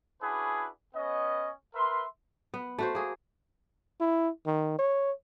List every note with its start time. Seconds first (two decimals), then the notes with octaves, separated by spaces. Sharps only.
0.21 C#4 D4 E4 F#4 G#4 B4
0.95 B3 C#4 D#5
1.75 A#4 B4 E5 C6
2.54 B3
2.79 A3 F#4 C5
2.95 A#3 G#4
4.00 E4
4.46 D#3
4.79 C#5